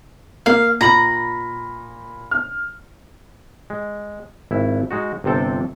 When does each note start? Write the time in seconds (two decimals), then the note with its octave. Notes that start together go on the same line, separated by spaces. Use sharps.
0.46 A#3 F5
0.81 A#2 A#5 B5 F#7
2.31 F6
3.70 G#3
4.51 G#1 E4
4.91 G#3 D#4 F#4
5.24 G1 C3 C4 A4 G5